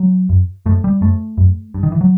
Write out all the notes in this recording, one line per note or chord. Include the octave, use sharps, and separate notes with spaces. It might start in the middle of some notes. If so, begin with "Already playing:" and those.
Already playing: F#3
F#2
F#2 A3
G3
F#2 A3
F#2
G2
D#3
E3
F#3